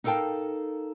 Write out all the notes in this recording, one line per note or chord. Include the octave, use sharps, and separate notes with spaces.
D#4 A4 A#4 F5 G5 A5